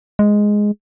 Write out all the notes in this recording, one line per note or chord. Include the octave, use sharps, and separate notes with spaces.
G#3